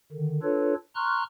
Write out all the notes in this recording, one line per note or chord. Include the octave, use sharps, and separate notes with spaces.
D3 D#3
D4 F4 A4 B4 C#5
A#5 C6 C#6 F6 F#6